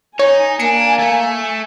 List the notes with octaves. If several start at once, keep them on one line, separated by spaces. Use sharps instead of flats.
D#4 C#5 G#5
A#3 D4 C#7
A3